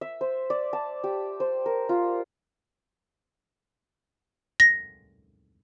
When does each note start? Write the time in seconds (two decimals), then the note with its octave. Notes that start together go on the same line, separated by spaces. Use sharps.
0.01 E5
0.21 C5
0.50 D5
0.73 A5
1.04 G4
1.40 C5
1.66 A#4
1.89 F4
4.60 A#6